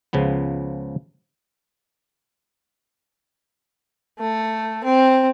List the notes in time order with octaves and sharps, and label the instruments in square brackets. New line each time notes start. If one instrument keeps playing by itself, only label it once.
[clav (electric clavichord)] C#2 C#3 F3 B3
[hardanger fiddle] A3
C4